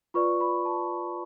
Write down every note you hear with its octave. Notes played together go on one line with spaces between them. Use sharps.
F4 B4 D5 C#6
B5
A5